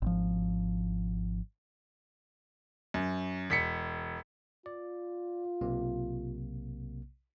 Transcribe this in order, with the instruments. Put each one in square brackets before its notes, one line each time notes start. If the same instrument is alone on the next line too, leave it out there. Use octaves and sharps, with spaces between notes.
[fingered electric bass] G#1 F3
[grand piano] F#2
E1 B6 C#7
[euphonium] F4 [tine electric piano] D5
[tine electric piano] B1 C3 A#3